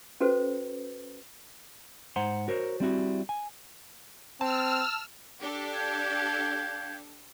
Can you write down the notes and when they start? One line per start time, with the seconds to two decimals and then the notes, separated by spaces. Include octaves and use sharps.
0.20 C#4 F#4 A4 B4 C5
2.16 G#2 C5 F#5 A#5 C6
2.48 F#4 A#4 C5 C#5
2.80 G3 C4 E4 F#4
3.29 G#5
4.41 C4 A5 E6 F6
5.41 D4 G4 A4
5.74 F5 G6 G#6